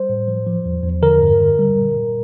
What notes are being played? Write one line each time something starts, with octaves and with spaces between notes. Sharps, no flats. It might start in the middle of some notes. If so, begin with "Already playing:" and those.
Already playing: G3 C5
A2
F3
F3
E2
E2
D3 A#4
G2
D3
G3
A#2
A#2